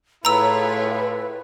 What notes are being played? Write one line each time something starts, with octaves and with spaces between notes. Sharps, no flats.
A2 E4 F4 G#4 B4 C#5 A#5 E6